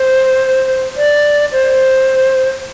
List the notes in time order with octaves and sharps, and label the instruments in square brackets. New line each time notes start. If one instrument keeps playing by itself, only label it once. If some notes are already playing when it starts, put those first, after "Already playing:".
Already playing: [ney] C5
D5
C5